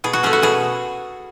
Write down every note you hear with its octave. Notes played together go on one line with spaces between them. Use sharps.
B2 G#4
F#4
A3 C#4 G#4
F#4
B2 G#4